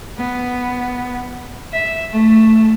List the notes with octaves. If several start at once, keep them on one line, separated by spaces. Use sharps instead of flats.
B3
E5
A3